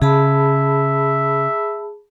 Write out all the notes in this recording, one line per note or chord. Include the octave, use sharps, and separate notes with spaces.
C#3 G#4 E5 A5 B5